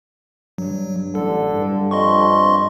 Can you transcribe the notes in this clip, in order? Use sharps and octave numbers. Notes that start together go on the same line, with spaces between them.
G2 F#3
A1 D3 A4
G2
F2 D#5 C6 C#6